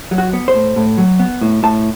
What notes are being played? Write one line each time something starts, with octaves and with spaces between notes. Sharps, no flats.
F#3
F#4
B3
C5
A2
A2
F#3
B3
A2
A2 A5